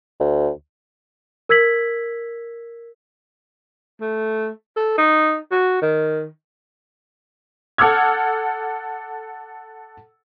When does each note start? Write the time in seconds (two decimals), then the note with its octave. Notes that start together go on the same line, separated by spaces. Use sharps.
0.20 D2
1.49 A#4 E6 G#6 B6 F#7
4.01 A3
4.76 A4
4.98 D#4
5.51 F#4
5.82 D#3
7.78 A4 F#5 D6 E6 F6 G#6